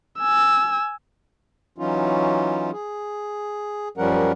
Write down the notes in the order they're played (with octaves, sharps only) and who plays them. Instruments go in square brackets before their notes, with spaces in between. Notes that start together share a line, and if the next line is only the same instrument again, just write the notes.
[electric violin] G#5 E6
[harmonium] E3 F#3 C#4 D#4 F4
G#4
F#2 F3 G3 C#4 A#4 F#5